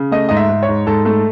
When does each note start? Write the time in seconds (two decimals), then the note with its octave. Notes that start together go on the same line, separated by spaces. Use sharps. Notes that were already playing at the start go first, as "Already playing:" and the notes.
Already playing: C#3
0.12 A3 D#5
0.29 G#2 D#5
0.37 E5
0.49 G#2
0.63 C#5
0.68 G#2
0.86 G#2 A4
1.05 A3 A4